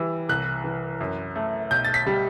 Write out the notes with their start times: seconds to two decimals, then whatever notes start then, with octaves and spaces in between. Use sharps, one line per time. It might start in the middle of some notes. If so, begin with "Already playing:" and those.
Already playing: E3 G3 E6
0.29 C2 F#6
0.64 E3
1.00 F#2
1.36 A3
1.71 B1 G6
1.85 A6
1.94 B6
2.06 G3